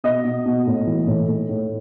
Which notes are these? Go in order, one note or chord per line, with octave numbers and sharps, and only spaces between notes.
B2 D#5
B2
B2
A2
E3
A2
A2
A2